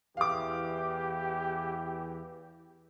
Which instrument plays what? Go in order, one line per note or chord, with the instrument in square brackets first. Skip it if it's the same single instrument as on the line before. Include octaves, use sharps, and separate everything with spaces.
[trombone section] E2 E3 [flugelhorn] G4 [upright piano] F5 D6